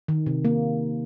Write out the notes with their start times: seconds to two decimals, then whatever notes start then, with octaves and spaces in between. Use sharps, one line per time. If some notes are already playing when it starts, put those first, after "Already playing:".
0.08 D#3
0.26 C3
0.45 A#3